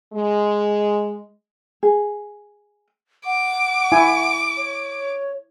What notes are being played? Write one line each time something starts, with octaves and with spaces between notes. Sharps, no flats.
G#3
G#4
F#5 D6
E4 G#5
C#5